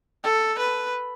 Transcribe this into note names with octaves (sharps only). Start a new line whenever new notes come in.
A4
B4